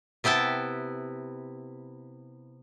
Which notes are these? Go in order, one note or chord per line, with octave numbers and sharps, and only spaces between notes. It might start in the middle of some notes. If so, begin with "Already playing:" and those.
C3 B3 E4 G5 A5